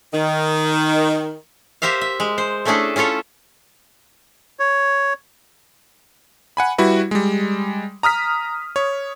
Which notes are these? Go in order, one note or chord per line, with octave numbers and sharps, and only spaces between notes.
D#3
G4 A#4 C5 E5 F5
E5
G#3
C5
A3 C#4 D4 E4 G#4 A4
C#4 E4 F4 A4 C#5
C#5
F#5 G#5 B5
G3 E4 F#4 B4
G3 G#3
A#5 D#6 F6 B6
C#5